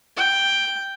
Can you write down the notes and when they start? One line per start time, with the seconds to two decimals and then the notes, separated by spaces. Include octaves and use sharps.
0.17 G5